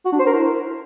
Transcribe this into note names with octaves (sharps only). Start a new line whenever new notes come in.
F#4
D4
C5
A#4
E4